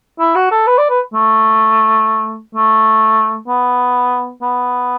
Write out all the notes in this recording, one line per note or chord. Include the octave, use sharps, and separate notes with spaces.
E4
F#4
A4
B4
D5
B4
A3
A3
B3
B3